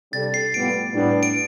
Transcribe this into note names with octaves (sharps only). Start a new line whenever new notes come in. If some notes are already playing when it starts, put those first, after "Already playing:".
C3 G3 D4 A4 A6
C7
A2 G3 B3 F4 D7
A2 G3 B3 D4
D7